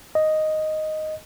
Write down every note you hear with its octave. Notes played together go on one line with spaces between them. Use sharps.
D#5